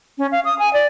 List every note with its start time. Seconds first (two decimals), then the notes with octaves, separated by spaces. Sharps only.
0.18 C#4
0.32 F5
0.45 D#6
0.59 G#5
0.73 D5